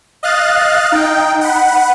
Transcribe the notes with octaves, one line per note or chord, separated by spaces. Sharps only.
D#5 F5 F#6 A6
D#4 G5
F#5 B5